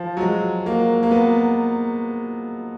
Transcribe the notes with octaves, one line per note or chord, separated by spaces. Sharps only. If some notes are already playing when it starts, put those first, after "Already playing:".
Already playing: F3
F#3
G#3
A#3
A#3
B3